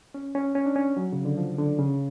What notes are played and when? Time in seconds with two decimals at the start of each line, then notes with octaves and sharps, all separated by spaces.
0.14 C#4
0.35 C#4
0.55 C#4
0.66 D4
0.76 C#4
0.97 F#3
1.13 C#3
1.25 D3
1.38 F3
1.58 D3
1.79 C#3